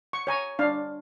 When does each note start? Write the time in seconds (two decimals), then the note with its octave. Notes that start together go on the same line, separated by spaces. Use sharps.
0.13 C#6
0.27 C#5 G#5 A#5
0.59 D4 F5